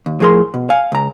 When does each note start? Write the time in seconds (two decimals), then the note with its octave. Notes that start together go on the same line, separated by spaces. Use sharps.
0.06 D#2
0.20 A2 F3 G#4 A#4 C6
0.54 B2
0.70 F5 G#5
0.92 C#2 A#5